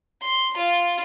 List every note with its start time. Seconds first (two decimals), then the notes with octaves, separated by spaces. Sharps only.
0.22 C6
0.57 F4